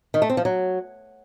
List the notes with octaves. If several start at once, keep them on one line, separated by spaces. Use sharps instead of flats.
D#3
A3
C4
F3
F#3